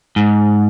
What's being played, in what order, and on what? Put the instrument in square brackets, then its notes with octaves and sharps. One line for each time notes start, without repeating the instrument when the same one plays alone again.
[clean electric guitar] G#2